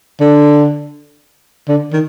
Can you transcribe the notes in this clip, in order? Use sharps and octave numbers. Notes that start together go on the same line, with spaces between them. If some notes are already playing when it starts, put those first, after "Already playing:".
D3
D3
D#3